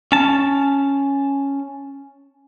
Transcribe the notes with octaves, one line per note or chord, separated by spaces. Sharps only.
C#4 A5